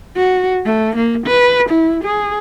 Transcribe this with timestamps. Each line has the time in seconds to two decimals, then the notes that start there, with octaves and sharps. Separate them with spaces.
0.16 F#4
0.65 A3
0.96 A#3
1.26 B4
1.69 E4
2.04 G#4